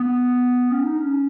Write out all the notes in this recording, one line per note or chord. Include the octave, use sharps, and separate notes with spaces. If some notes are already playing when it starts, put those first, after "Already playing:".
Already playing: B3
C#4
D#4
C#4